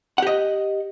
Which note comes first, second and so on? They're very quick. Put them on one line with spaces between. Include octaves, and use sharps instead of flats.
F#5 G4 D#5